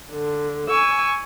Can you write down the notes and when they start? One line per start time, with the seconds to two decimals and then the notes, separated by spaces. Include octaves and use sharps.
0.12 D3
0.69 G#5 C#6 E6